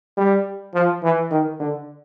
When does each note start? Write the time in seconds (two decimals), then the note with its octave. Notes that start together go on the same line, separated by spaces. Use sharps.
0.17 G3
0.74 F3
1.03 E3
1.31 D#3
1.60 D3